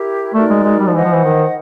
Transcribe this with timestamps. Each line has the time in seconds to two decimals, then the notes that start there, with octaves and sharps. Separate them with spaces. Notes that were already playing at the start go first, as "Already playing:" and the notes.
Already playing: E4 G4 A#4
0.34 A3 D#4 F#4 A#4 D5
0.50 G#3
0.64 G#3
0.80 G3
0.88 F3
0.94 E3 C5 D#5 F#5
1.04 F3
1.14 E3
1.24 D#3